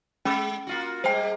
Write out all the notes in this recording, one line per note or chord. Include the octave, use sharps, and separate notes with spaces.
G#3 C#4 D6
A#3 F4 F#4
G3 G#3 A#3 C5 G5